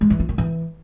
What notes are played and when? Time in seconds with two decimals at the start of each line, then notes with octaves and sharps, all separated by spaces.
0.01 G#3
0.10 E3
0.20 F4
0.29 D#3
0.38 E3